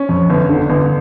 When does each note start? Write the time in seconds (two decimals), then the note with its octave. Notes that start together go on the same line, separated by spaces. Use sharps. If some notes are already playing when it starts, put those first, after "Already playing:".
Already playing: C#4
0.09 F2
0.30 G1
0.49 D3
0.70 G1